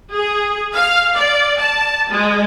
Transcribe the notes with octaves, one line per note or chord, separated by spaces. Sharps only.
G#4
F5
D5
A5
G#3